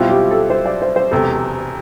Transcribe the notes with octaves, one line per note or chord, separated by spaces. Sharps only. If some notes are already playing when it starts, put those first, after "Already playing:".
Already playing: B2 G3 C4 E4 F4
G4
A4
C5
D5
C5
C5
E1 E2 C3 A4